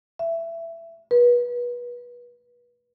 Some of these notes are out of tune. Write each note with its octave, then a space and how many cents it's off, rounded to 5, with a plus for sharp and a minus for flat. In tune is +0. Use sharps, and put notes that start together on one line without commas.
E5 +15
B4 -30